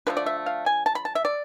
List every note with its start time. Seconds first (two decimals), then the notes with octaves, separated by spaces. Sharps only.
0.07 D3 F3 A3 B4
0.17 D5
0.26 E5
0.46 F5
0.66 G#5
0.86 A5
0.95 B5
1.05 A5
1.15 E5
1.25 D5